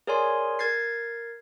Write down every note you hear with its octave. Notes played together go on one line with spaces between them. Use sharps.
G#4 A#4 C#5 D5 G#5 C6
A#4 G#6 A6 C7